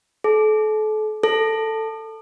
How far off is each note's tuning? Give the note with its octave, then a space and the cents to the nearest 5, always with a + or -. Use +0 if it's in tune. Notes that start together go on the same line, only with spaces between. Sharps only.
A4 -35
A4 +10